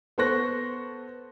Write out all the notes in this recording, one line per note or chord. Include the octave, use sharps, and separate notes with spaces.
B3 A4 C5 C#6 F#6 A#6